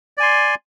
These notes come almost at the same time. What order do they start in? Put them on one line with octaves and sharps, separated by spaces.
D5 G#5 C6